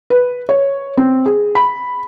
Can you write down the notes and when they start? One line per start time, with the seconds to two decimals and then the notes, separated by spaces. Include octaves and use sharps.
0.10 B4
0.49 C#5
0.97 C4
1.26 G#4
1.55 B5